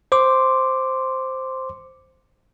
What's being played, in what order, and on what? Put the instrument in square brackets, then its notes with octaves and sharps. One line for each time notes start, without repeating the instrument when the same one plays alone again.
[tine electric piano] C5 C6 D6